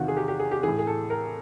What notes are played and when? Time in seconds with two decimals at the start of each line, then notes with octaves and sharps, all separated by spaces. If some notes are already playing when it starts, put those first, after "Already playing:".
Already playing: E2 C3 D#3 F4 F#4
0.08 G#4
0.17 G4
0.28 G4
0.40 G#4
0.51 G4
0.63 A2 E3 G#4
0.79 G#4
0.87 A4
1.10 A#4